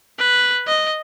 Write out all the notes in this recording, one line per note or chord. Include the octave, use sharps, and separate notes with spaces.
B4
D#5